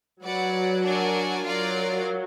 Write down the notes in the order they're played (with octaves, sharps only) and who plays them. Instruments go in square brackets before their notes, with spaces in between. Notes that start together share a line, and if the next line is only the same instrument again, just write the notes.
[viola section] F#3 [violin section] F#4 B4 D5 F#5
[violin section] D4 F#4 A#4 D5 G#5
[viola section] F#3 [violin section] F4 A#4 D5 F5